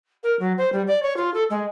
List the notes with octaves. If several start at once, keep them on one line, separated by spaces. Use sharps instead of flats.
A#4
F#3
C5
G3
D5
C#5
F4
A4
G#3